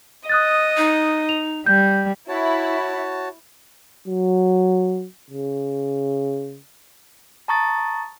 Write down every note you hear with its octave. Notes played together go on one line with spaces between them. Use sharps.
D#5 D#6 F#6 A6
D#4
F7
G3 G6
E4 F#4 C#5 A5
F#3
C#3
A5 A#5 C#6 D#6 A6